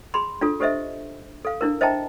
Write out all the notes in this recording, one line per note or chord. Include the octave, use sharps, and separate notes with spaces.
G#4 B5 C6
D4 F4 A4
G4 A4 C5 D#5 E5
A4 F5
D4 E4 A#4
C5 D#5 E5 G5 A5 A#5